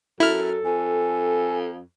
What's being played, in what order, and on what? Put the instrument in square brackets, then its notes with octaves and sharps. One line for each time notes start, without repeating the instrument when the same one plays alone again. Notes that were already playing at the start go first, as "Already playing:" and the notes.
[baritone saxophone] F#2 [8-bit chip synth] E4 F6 [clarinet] A4
[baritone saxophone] F2 [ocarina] G#5